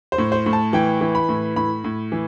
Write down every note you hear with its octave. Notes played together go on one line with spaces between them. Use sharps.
C5
A2
C5
A2
A5
E3 G5
E3
B5
A2
A2 B5
A2
E3